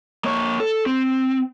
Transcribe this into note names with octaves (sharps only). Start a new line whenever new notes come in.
A#3 C#5
A4
C4